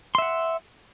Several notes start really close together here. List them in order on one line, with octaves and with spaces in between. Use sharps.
C6 E5 F#5